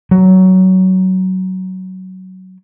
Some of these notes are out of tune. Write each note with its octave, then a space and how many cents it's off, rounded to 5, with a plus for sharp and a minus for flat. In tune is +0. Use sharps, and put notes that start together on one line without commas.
F#3 +15